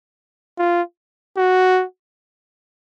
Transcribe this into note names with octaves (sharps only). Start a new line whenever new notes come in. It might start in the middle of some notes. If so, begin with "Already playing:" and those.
F4
F#4